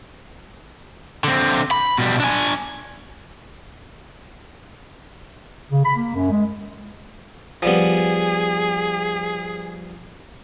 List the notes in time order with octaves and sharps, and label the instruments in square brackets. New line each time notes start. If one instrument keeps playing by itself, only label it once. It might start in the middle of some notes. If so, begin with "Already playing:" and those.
[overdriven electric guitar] D3 C4
B5
B2 G3
D4 G#5
[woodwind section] C#3
B5
A#3
F#2
G#3
[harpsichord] F3 G3 B3 [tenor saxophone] G#4